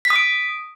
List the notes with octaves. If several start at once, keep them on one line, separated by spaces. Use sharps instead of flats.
B6
D#6
D7